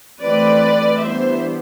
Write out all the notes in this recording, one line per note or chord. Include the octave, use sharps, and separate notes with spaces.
E3 A3 C4 B4 D5
E3 G3 B3 D4 C5 E5